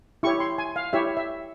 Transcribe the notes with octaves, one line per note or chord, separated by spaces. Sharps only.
E4 G4 C#5 C#6
C6
G#5
F5
E4 G4 C#5 E5
E5